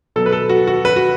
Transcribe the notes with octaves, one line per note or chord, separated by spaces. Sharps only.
B2 F#3 A4
B4
A4
F#4
F#4
B4
F#4